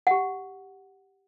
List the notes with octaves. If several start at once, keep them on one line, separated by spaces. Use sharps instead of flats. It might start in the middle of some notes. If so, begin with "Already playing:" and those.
G4 F#5